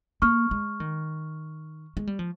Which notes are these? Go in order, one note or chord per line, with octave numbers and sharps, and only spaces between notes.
A#3 C#6 F6
G#3
D#3
G#3
G3
F3